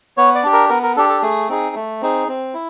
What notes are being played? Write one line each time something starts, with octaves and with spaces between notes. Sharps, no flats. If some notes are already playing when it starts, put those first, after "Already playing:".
B3 C#5
D5
D4 G4
A#4
B3 A#4
A#4
D4 G4 A4
A4
A3 G#4
C4 D#4 G#4
A3
C4 D#4 G#4
C4
E4